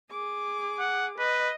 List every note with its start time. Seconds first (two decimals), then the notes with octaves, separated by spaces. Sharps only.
0.11 G#4 D6
0.79 F#5
1.19 B4 D#5